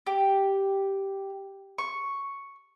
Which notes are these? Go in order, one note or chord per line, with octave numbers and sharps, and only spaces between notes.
G4
C#6